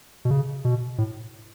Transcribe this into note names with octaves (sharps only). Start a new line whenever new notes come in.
B2
C#3
B2
A2